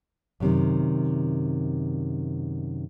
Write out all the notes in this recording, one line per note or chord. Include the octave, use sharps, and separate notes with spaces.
F#2 C3 D#3